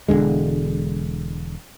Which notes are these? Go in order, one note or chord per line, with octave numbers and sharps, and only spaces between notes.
E1 D#2 D3 G#3